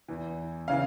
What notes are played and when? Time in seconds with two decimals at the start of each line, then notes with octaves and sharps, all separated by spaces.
0.08 E2 E3
0.68 C#3 E3 F5